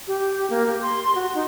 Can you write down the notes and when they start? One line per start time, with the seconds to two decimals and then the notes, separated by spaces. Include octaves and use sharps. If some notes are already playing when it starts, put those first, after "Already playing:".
0.08 G4
0.50 A#3
0.67 G4
0.82 C6
1.15 F#4
1.35 D#4